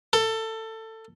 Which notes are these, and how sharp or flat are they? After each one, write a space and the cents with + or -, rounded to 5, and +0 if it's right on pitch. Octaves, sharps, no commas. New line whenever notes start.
A4 +20